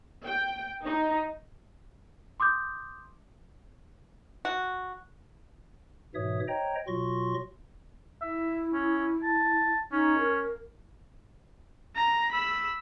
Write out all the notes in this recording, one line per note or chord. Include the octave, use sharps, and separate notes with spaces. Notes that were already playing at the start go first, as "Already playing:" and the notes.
G5
D#4
C6 D6 D#6 G6
F#4
G#2 B2 E3 C#5 E5 D#6
C5 C#5 D#5 G5 A#5
B2 F#3 F4 C6 C#6 A#6
E4 E5
C#4
A5
C#4 D#4
A#4
A#5
B5 E6